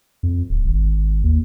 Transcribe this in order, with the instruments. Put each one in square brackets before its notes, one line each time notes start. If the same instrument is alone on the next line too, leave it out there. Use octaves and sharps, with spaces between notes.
[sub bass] F2
D1
G#1
D#2